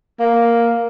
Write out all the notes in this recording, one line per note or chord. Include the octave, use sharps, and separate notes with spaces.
A#3